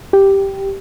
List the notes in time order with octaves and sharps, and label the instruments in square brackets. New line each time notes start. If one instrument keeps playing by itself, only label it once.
[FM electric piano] G4